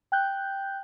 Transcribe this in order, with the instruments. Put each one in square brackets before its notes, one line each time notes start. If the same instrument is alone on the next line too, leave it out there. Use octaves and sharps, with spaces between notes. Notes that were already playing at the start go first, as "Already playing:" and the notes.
[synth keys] G5 F#6 G6